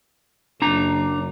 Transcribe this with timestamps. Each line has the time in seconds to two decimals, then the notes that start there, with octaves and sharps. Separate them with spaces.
0.62 F#1 D4 A#5